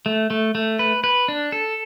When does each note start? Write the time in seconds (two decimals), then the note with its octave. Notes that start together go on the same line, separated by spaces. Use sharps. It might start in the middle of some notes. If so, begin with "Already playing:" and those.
0.06 A3
0.30 A3
0.55 A3
0.79 B4
1.04 B4
1.28 D4
1.52 A4